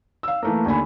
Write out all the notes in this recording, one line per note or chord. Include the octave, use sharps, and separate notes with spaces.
F5 E6
E3 A3 A#3
D#2 D3 G#5 B5